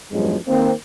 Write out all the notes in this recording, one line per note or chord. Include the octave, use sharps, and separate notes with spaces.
A1 E2 G2 F3 F#3 G#3
D#3 A#3 C4